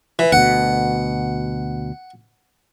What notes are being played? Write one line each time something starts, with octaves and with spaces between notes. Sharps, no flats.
E3
D2 B2 F#5